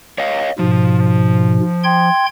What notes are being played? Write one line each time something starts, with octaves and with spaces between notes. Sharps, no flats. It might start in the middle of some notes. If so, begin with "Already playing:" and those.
C#5 D#5 F5
G#2 B2 F3
G5 C6 G#6